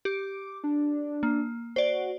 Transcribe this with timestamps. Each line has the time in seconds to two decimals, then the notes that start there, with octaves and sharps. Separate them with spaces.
0.05 G4 D6
0.64 D4
1.23 A#3
1.76 F#4 C5 D5